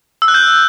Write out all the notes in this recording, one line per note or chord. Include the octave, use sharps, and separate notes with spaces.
E6
F#6
G6